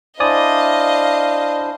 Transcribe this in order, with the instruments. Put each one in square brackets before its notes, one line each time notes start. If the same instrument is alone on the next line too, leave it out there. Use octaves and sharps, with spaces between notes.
[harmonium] D4 E4 C5 [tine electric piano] D5 G#5 D#6 [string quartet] D#5 F5